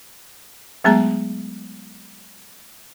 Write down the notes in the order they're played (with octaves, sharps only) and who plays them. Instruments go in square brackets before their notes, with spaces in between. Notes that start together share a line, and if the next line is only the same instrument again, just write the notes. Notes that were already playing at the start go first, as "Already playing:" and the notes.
[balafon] F#3 G#3 A3 B3 G#4 A#5